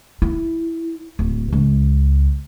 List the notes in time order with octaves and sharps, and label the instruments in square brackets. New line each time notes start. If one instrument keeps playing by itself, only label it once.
[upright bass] E4
D1
C#2